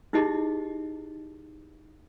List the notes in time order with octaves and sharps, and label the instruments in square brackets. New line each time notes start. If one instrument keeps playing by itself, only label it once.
[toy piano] D#4 E4 G4 G#4 D#5